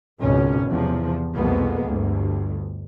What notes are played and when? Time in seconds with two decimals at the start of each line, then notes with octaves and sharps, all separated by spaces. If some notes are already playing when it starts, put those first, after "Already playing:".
0.21 G#1 C#2 B2 C#4
0.68 E2 C3 F3
1.35 C2 F2 B2 G#3 A#3 B3
1.83 G1 D2 G2